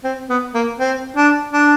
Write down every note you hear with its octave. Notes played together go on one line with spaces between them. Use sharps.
C4
B3
A#3
C4
D4
D4